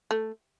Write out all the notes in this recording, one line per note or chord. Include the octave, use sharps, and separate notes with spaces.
A3